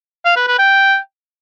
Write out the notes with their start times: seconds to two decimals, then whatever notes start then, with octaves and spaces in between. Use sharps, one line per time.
0.25 F5
0.36 B4
0.47 B4
0.59 G5